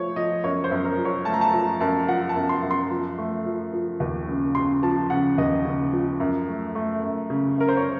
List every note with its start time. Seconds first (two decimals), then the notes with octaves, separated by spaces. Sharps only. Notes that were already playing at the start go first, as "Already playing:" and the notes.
Already playing: F3 A3 C5 C#5
0.16 F3 D#5
0.43 F#2 C#5
0.64 C5
0.71 F#2
0.85 A#4
0.98 F3
1.05 C#5
1.25 A3 A5
1.34 A#5
1.41 A5
1.53 F3 A#5
1.80 F#2 A5
2.08 F3 F#5
2.29 A5
2.35 F#2
2.49 C6
2.63 F#2
2.71 C6
2.91 F3
3.18 A3
3.46 F3
3.73 F3
4.00 D#2
4.28 C#3
4.55 C#3 C6
4.83 F3 A5
5.10 C#3 F#5
5.38 D#2 D#5
5.65 C#3
5.93 F3
6.20 F#2
6.48 A3
6.75 A3
7.02 F#2
7.30 C#3
7.57 F#2 A#4
7.68 C5
7.77 C#5